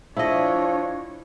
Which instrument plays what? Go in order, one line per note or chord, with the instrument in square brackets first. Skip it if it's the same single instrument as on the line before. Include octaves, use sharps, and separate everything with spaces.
[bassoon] F3 [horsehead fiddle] D4 C#5 [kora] E4 D#5